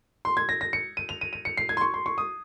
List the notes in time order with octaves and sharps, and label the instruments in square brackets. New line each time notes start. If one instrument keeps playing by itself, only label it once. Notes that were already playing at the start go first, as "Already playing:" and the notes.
[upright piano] C6
G#6
A#6
A#6
C#7
D#7
F7
D#7
D#7
C#7
C7
G#6
C6
C#6
C6
C#6
D#6